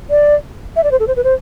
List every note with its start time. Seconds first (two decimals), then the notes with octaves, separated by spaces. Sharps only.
0.10 D5
0.76 E5
0.84 D5
0.91 C5
1.00 A4
1.08 C5
1.16 B4
1.24 C5